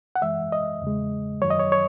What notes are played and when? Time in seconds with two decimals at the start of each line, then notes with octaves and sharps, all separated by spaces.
0.16 F#5
0.22 F#2 E3 G#3 E5
0.52 D#5
0.82 E2 C#3 G#3
1.42 F#2 D#3 F#3 C#5
1.50 D#5
1.59 C#5
1.72 C#5